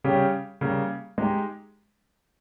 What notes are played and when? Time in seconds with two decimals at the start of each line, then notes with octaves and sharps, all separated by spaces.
0.04 C#3 G3 C#4 G4
0.61 C#3 G3 A#3
1.18 G#3 D#4 G4